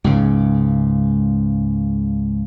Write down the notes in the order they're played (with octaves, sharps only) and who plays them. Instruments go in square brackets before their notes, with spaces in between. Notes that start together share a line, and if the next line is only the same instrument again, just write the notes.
[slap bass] C#2 G#2 C#3